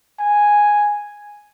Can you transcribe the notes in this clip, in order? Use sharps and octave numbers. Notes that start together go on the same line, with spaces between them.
G#5